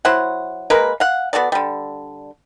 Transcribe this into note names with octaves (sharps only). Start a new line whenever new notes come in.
F#3 E4 C5 F#5
G#3 A#3 A#4 B4
F5 F#5
B3 F#4 A4 D5
D3 G3